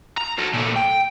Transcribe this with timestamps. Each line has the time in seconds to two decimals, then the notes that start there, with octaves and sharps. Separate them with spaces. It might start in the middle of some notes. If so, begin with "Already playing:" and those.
0.17 A#5
0.38 F#4 A4
0.54 A#2 A3
0.76 G5